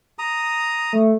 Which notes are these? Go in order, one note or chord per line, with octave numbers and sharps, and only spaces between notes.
A#5 D#6
A3